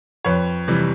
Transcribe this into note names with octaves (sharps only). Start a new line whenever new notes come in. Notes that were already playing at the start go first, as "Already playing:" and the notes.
F2 B4 C#5
C3 E3 G3